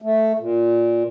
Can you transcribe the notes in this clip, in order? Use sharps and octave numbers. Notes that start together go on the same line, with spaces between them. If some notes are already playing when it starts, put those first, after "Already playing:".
A3
A#2